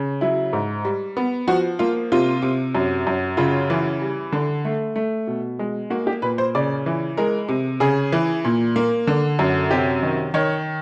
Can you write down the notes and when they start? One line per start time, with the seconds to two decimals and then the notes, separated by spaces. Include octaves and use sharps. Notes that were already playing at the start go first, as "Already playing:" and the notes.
Already playing: C#3
0.21 F#3 E4
0.53 G#2
0.85 G3
1.17 B3
1.47 F3 F#4
1.79 A#3 F4
2.12 C3 F4
2.42 C3
2.75 F#2
3.07 F#2
3.37 C#3 F4
3.70 E3
4.02 G3
4.32 D3
4.65 A3
4.96 A3
5.27 B2
5.59 G#3
5.90 A#3 F#4
6.07 G4
6.22 A#2 B4
6.38 C5
6.55 C#3 D5
6.86 E3
7.17 G#3 A#4
7.49 C3
7.80 C#3 G#4
8.12 E3
8.45 A#2
8.76 A#3
9.07 D3
9.39 F#2
9.70 C3 G4
10.03 D#3
10.34 D#3 C#5